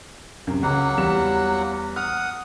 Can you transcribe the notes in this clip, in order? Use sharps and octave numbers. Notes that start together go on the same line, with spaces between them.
F#2 C3
C#2 F#3 A#3 F#5
E2 G3 E7
F#5 D#6 F6